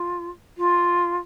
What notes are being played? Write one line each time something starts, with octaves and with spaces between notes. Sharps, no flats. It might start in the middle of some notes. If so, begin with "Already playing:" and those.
Already playing: F4
F4